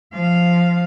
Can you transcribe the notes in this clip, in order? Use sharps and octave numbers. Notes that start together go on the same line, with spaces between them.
F3 F5